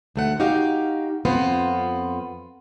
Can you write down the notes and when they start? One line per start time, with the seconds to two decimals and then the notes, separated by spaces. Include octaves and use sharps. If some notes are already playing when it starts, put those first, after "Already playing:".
0.16 D2 A3 F#5
0.40 D#4 F#4 G4 F5
1.25 F2 B3 C4 F4